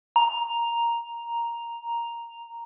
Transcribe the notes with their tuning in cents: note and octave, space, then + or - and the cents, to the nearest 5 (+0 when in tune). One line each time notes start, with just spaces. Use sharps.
A#5 +0